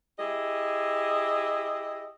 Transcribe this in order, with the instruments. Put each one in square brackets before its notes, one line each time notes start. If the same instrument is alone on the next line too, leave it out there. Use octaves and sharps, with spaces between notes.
[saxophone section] E4 G4 G#4 D#5